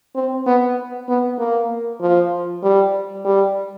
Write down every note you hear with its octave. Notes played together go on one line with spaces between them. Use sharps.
C4
B3
B3
A#3
F3
G3
G3